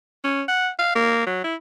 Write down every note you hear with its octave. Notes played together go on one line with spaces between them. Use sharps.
C#4
F#5
F5
A#3
F#3
E4